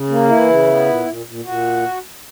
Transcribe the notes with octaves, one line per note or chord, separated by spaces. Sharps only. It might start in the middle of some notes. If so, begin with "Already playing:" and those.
Already playing: C#3
A#3
E3 E4
C#3
B3
A#2
A#2
A#2
A#2 F#4